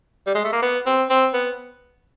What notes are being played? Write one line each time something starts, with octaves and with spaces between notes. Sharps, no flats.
G3
G#3
A3
A#3
B3
C4
C4
B3